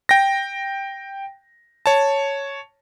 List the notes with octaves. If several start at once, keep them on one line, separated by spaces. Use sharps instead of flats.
G5 A#6
C#5 A5